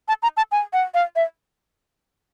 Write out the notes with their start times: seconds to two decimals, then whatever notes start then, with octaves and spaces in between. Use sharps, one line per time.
0.08 A5
0.23 A#5
0.37 A5
0.52 G#5
0.73 F#5
0.94 F5
1.16 E5